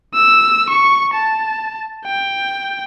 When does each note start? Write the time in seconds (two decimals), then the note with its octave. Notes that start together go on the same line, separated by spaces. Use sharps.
0.14 E6
0.70 C#6
1.13 A5
2.05 G5